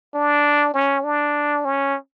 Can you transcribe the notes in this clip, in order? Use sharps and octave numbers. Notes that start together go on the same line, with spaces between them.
D4
C#4
D4
C#4